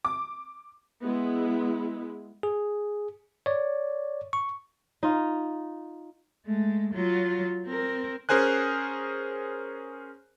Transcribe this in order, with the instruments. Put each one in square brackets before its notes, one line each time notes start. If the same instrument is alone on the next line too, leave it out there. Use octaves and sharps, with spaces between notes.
[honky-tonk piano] D6
[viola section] G#3 B3 E4
[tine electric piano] G#4
C#5 D5
C#6
[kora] D#4 F4
[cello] G#3 A3
F#3 F4
C4 A#4
[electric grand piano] C#4 G#4 A#4 C5 G#5 F#6